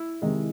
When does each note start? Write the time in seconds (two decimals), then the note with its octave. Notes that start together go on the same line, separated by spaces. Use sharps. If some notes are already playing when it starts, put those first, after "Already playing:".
Already playing: E4
0.22 C3 D#3 G#3